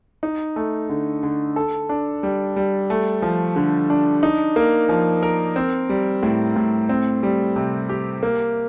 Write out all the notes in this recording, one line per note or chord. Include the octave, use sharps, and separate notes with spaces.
D#4
A3
D3
D3
A4
D4
G3
G3
A3
F3
D3
D4
D#4
A#3
F3
A#4
C4
G3
A2
A2
C4
G3
C3
G4
A#3